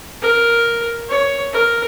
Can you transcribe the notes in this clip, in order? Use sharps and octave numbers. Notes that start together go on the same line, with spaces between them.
A#4
C#5
A#4